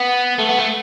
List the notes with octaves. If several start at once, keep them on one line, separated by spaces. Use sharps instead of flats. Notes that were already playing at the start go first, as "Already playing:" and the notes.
Already playing: B3
A3
B3
A3